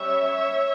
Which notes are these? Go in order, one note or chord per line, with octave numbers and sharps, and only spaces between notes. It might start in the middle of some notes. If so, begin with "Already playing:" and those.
Already playing: G3 C#4 C#5 E5